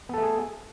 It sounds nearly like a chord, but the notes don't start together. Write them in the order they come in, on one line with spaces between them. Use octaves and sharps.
B3 A4 A3 G#4